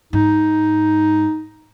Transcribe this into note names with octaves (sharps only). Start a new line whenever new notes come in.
G#2 D#4